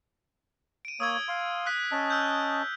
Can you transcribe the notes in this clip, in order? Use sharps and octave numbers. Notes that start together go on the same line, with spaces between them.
D7 D#7
A#3 C#5 D#6 E6 G#6
F5 C6
D#6 F#6 B6
C#4 D#5 A5
E6 F#6 G6